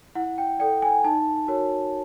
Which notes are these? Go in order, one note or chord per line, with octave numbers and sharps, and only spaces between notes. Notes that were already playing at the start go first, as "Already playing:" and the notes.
E4 F#5
G5
A4 D5 G5
G#5
D#4 A5
F#4 A#4 C#5